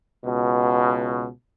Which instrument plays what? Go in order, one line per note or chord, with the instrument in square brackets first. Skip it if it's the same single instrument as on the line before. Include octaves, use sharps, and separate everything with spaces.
[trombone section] C#2 B2